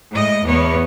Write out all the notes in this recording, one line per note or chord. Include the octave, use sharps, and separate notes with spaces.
A2 G#3 D#5
E2 B3 C#5